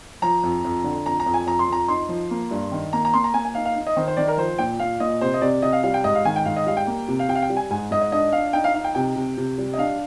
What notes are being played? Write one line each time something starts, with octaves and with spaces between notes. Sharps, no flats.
F3 A#5
F2
F2
D3
F2 A#5
A#5
F2
G#5
F2 A#5
C6
F2 A#5
D#4 C6
F3
A#3
G2
D#3
A#3 A#5
A#5
A#3 C6
A#5
A#3 G#5
G#5
D#4 F5
F5
D#4
D#5
D#3 C5
C5
D#3 D5
A#4
F3 C5
A#2 G5
A#2 F5
A#2 D#5
C3 C5
D#5
C3 D5
C3 D#5
F5
G3 F5
G5
G#2 D#5
F5
D#3 G#5
G5
G#2 F5
D#5
G3 F5
G5
A#3
C3
F5
C3 G5
F5
G5
G3
G#5
G#2 G#5
G#2 D#5
D#5
D4 D#5
D4 F5
D#4 G5
F5
D#4 F5
G5
C3 G5
C3
C3
G3
D#5
D4 F5